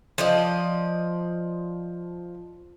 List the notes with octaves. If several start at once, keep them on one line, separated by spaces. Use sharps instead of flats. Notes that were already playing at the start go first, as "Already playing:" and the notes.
F3 D5 D#5